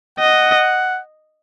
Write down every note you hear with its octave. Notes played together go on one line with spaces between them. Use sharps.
D#5 F#5